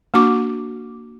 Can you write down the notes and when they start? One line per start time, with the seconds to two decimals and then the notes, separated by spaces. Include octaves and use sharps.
0.14 A#3 D4 F#4 D6